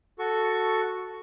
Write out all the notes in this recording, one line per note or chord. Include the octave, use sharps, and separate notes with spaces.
F#4 A4 C#6